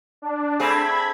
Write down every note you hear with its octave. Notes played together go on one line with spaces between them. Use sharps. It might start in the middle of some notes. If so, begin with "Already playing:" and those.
D4
A3 C4 G#4 B5 G#6